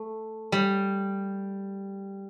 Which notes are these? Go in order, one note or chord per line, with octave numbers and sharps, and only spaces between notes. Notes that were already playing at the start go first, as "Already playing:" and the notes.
Already playing: A3
G3